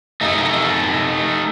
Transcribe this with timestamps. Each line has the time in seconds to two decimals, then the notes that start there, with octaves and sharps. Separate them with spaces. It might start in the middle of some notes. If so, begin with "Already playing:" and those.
0.21 A3 D#4